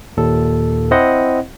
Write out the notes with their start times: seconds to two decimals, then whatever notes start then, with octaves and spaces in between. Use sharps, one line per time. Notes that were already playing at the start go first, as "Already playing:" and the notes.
0.17 D#2 A#2 A4
0.91 C4 E4 C5 D#5 F#5